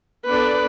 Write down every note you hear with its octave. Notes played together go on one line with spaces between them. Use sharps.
B3 D4 A4 B4 D5